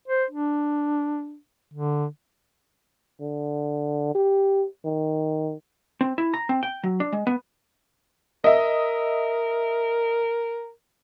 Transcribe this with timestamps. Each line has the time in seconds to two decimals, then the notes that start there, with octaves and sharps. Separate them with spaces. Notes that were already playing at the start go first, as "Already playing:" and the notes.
0.08 C5
0.31 D4
1.74 D3
3.20 D3
4.15 G4
4.85 D#3
6.01 C4
6.18 E4
6.34 A#5
6.49 C4
6.63 G5
6.83 F#3
7.00 D4
7.12 G#3
7.27 B3
8.44 A#4 D#5 E5